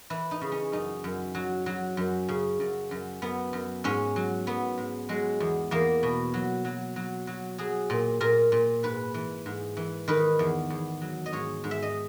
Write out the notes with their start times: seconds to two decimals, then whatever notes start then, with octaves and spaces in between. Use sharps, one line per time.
0.10 E3 E4
0.31 D#4
0.41 C#3
0.52 C#4
0.72 F#2 D#4
1.04 F#2
1.35 F#3
1.66 F#3
1.97 F#2
2.28 C#3
2.60 F#2
2.91 F#2
3.22 F#2 B3
3.53 F#2
3.84 G#2 C#4
4.16 F#3
4.47 F#3 B3
4.78 G#2
5.09 F#3 G#3
5.40 E2
5.71 E2 A#3
6.03 B2
6.34 F#3
6.65 F#3
6.96 F#3
7.27 F#3
7.58 F#3 G#4
7.90 A#2
8.21 A#2 A#4
8.52 A#2
8.83 G#2 B4
9.14 E3
9.46 G#2
9.77 E3
10.08 D#3 B4
10.39 E2
10.70 E2
11.01 F#3
11.26 D#5
11.32 G#2 C#5
11.64 G#2
11.71 E5
11.82 D#5